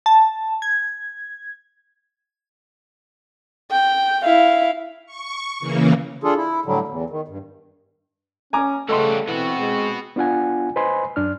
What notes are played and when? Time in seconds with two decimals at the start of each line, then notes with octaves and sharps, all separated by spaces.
0.06 A5
0.62 G#6
3.71 G5
4.24 E4 F5
5.06 C#6
5.60 C#3 E3 A#3
6.24 D4 F4 G#4 A4
6.37 E4
6.65 A2 D3 F#3 G3
6.88 E2
7.10 D#3
7.28 G2
8.53 C#4 G#5 A#5 D6
8.89 C#3 G3 A3 F#4 A4 D#5 C6
9.28 E3 B3 C4 F#4
9.59 G#3
10.16 B3 D4 F4 F#5 G#5
10.76 B4 C5 D#5 G#5 B5 C6
11.16 F#2 D4 F6